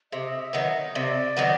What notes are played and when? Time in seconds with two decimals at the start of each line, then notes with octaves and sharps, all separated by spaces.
0.12 C3 D#5
0.39 E5
0.53 D#3 F#3 B3
0.67 D#5
0.95 C3 D5
1.37 D#3 F#3 B3